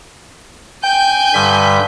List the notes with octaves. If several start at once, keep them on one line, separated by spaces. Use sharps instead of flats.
G5 G#5 G6
G2 D3 G3 B6